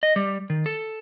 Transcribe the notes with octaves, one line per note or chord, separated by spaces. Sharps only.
D#5
G3
D#3
A4